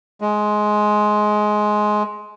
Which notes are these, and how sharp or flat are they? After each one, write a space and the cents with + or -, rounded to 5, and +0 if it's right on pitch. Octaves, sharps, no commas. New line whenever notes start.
G#3 +15